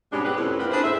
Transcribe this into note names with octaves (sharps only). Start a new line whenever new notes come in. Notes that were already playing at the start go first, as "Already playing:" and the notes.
G#2 B2 G3 G#3 C#4 D4
B3 C4 G4 G#4 B4
F2 A2 C3 E3 C#4 E4
B3 C4 D4 F4 A#4 B4
D4 E4 G#4 B4 C5
E2 A2 C5 E5